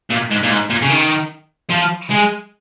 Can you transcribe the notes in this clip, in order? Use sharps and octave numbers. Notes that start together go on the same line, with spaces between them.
A#2
G#2
A#2
G#2
A#2
C#3
D#3
F3
G#3